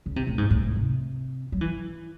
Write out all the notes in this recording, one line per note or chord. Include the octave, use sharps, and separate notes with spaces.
C#3
C3
A2
G#2
A2
A2
C3
F#3
E3